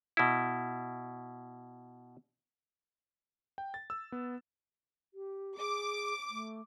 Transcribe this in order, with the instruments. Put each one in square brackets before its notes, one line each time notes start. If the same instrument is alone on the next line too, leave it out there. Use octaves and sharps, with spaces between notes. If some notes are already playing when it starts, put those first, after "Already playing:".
[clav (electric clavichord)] B2 E4
[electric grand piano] G5
A6
E6
B3
[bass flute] G4
[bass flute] G#4 [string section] D6
[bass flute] A3